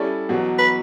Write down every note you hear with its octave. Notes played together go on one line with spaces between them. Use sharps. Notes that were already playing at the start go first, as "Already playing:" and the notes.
Already playing: G3 C#4 E4 A4 D5
E2 B2 F#3
B4